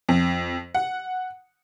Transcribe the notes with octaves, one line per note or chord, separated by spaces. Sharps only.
F2
F#5